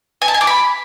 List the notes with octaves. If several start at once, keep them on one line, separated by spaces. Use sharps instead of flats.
G#5
A5
G#5
D6
B5